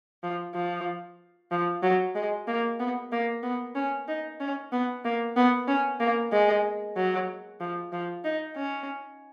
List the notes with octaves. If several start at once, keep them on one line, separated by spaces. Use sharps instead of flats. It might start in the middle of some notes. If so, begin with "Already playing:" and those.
F3
F3
F3
F#3
G#3
A#3
B3
A#3
B3
C#4
D#4
C#4
B3
A#3
B3
C#4
A#3
G#3
F#3
F3
F3
D#4
C#4